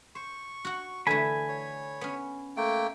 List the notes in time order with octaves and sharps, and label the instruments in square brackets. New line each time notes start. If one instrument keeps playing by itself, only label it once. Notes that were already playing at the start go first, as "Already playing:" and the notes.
[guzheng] C5 [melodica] C#6
[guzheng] F#4 F#5
[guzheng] D3 E3 A3 [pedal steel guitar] G#5 B5
[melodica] C#5
[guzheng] B3 C#4
[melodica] A3 A#3 G5